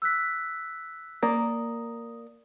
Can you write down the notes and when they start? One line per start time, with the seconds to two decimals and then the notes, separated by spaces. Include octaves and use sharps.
0.02 E6 F#6 B6
1.23 A#3 D5 D#6